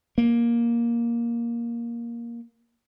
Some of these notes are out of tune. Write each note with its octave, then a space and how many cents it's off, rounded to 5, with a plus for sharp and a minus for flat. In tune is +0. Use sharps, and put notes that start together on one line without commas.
A#3 +10